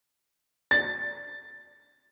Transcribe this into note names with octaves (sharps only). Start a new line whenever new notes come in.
A6